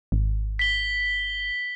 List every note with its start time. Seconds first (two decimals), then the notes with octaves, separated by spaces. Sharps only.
0.12 G#1
0.59 B6 G7